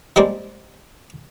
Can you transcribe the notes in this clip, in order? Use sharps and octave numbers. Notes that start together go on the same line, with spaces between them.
F3 G3 G#3 A#3 C4 D4